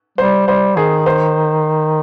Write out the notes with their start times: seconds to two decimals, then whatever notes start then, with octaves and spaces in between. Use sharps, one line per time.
0.18 G3 C5
0.47 G3 C5
0.76 D#3 G#4
1.06 C5